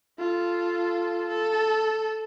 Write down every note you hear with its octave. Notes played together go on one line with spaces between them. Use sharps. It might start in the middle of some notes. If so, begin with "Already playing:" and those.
F4 A4
A4